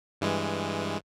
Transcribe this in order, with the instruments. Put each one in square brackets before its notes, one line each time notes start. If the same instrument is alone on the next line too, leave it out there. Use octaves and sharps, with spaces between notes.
[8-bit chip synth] G2 E3 G#3